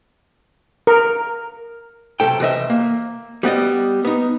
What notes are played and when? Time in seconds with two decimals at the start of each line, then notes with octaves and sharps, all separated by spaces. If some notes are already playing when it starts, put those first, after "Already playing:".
0.87 A#4
2.20 B1 G#2 C3 A4 G5
2.40 C3 E3 D#5 E5
2.70 A#3
3.43 G3 B3 D5 D#5
4.05 B3 D#4